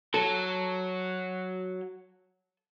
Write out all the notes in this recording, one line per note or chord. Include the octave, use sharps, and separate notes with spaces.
F#3 A4